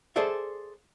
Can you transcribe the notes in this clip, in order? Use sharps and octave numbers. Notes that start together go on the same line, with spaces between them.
G#4 A4 C5 D5 E5